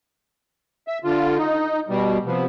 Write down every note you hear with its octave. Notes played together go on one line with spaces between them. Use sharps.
E5
D3 F4
D#4
B2 G3
C3 F3 B3